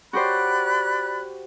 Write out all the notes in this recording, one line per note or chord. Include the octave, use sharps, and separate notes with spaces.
F#4 G4 C5 D5 B5 F#6